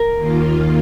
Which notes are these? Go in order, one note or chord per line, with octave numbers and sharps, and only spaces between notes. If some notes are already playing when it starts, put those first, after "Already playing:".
Already playing: A#4
D#2 D#3 A#3 F4